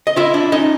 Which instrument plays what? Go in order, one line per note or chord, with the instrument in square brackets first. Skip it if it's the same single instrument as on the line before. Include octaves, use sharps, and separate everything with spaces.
[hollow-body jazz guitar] D#5
E4 F4 E5
D4
C#4 D#4 D#5